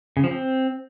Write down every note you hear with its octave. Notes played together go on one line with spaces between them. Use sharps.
C#3
F3
C4